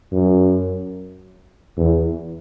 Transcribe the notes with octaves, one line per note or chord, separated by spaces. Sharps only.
F#2
E2